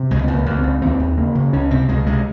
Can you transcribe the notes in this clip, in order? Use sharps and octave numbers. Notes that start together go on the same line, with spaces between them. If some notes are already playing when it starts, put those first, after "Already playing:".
Already playing: C3
C#2 G#3
C#2 C4
A#3
C#2
C4
C#2
D#2 C4
D#2
C#3 A#3
C#3
C#2 C#4
C3 C4
C#2 G#3
C3 G#3